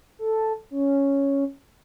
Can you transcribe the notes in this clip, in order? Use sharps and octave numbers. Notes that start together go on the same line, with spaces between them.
A4
C#4